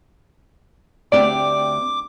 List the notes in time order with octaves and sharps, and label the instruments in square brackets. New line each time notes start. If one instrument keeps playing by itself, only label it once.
[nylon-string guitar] D2 C4 G4 [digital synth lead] D5 [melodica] D6